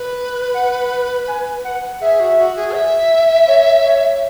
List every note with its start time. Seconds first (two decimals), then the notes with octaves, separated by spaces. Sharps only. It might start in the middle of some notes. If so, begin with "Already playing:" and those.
Already playing: B4
0.54 F#5
1.28 G#5
1.64 F#5
2.00 G#4 E5
2.20 F#4
2.38 F#4
2.56 G#4
2.75 E5
3.48 C#5
3.84 C#5